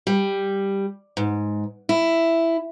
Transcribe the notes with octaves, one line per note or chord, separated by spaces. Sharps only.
G3
G#2
E4